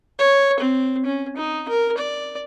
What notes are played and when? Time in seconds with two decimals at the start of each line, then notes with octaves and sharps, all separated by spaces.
0.19 C#5
0.60 C4
1.06 C#4
1.37 D#4
1.69 A#4
1.98 D5